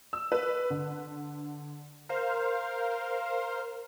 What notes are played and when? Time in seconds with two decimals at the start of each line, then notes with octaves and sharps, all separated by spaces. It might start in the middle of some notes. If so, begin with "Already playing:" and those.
0.13 E6
0.32 B4
0.70 D3
2.09 A#4 C5 F5